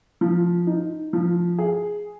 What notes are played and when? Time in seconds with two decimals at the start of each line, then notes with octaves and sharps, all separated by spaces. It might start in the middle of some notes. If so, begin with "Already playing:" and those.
0.21 F3
0.67 D#4
1.13 F3
1.58 G#4